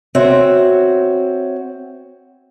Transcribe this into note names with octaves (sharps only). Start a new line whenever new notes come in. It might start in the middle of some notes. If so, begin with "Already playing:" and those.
C4 F#4 C#5 E5